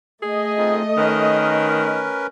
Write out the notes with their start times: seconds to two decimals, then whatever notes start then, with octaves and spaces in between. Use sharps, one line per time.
0.22 A3 G#4 D#5
0.58 C4 D#4 F4
0.97 D#3 C#4 A#4 B4